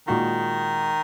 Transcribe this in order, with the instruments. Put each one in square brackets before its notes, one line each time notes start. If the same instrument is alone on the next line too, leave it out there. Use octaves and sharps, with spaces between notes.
[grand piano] A#2 G#3 D#4 F#4 [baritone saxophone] D#3